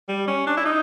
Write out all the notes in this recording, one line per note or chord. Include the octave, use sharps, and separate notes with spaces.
G3
C#4
D4
E4
D#4